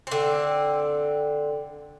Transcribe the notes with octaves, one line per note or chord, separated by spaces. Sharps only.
D3 C4